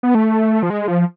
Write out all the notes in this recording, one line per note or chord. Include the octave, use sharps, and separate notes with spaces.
B3
A3
F3
G#3
F3